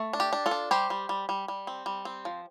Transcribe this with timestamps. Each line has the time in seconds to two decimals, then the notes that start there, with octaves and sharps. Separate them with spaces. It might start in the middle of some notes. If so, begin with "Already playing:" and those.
Already playing: A3
0.13 D4
0.20 G4
0.33 D4
0.46 F4 A4
0.51 D4
0.71 G3 G4 C5
0.90 G3
1.09 G3
1.29 G3
1.48 G3
1.67 C4
1.86 G3
2.05 C4
2.25 F3